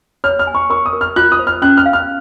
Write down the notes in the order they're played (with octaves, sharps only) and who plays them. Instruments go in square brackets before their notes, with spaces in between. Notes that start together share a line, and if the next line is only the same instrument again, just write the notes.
[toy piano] C#5 [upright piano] F6
[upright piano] F6
[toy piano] G#5
[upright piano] C#6
[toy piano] A#4 [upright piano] C#6
[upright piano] D#6
[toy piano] A#4
[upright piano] F6
[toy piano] F4 [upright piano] F#6
[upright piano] D#6
[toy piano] C5
[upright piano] F6
[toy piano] C#4 [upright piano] F#6
[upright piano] F6
[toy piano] F5
[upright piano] F6